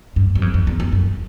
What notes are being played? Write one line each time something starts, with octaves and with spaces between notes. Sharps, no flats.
G2
F#2
F2
F2
E2
F2
F#2